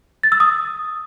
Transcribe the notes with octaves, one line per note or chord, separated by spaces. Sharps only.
A6
E6
D#6